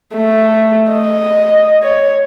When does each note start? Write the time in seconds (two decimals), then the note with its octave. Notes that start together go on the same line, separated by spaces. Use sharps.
0.14 A3
0.91 D#5
1.82 C#5